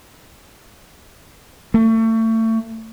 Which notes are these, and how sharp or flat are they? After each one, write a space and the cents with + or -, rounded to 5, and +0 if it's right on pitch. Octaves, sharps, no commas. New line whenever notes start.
A3 +30